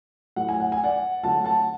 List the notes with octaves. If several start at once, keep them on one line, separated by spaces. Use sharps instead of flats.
A2 F#3 A3 F#5
G#5
F#5
G#5
D5 F#5
D3 F#3 A3 F#5 A5
F#5 A5